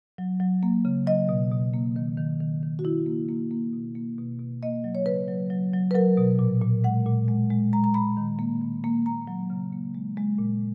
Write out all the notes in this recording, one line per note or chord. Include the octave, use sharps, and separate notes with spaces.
F#3
F#3
A#3
C#3
F#3 D#5
B2
B2
A#3
D#3
D#3
D#3
D#3
F#4
D#3 E4
A#3
A#3
A#3
B2
A#3
B2
B2
A#3 D#5
F#3
C#5
C#3 B4
F#3
F#3
F#3
B4
F#3 A#4
B2
A#2
A#2
G#3 F#5
A#2
G#3
G#3
G#3 A#5
A#5
G#3 B5
D#3
A#3
D#3
A#3
A#3 A#5
F#3
C#3
A#3
G#3
G#3
A#2